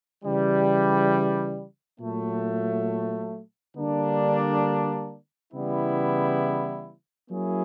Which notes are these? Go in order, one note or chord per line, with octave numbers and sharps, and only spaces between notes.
C#3 E3 G3
A#2 F#3 A3
D3 G3 A#3 D4
C#3 E3 G3 B3 E4
F#3 A#3 C#4 E4 G#4